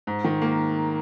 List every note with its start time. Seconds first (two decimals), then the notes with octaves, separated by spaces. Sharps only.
0.07 G#2
0.24 D#3
0.42 A#3